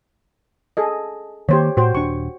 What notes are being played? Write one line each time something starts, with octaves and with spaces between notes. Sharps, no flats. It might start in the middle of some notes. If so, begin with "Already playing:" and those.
G#4 A4 D#5
D#3 A#3 G4 C5 C#5
A2 F#4 C5 G5
D#1 D4 C#6